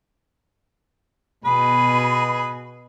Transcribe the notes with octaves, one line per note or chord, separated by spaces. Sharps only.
B2 G#4 B4 B5